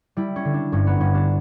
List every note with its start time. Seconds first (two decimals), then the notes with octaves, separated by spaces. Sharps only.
0.17 G3 E4
0.36 C#4
0.45 D3
0.54 D4
0.72 G2 C#4
0.87 B3
1.00 G2 C#4
1.14 D4